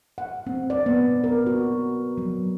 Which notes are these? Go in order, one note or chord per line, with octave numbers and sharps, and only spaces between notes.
F#5
C4
D5
B3
A#4
F#4
F#3